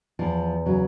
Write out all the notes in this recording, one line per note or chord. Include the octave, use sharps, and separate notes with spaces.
E2 F3
C#3 F#3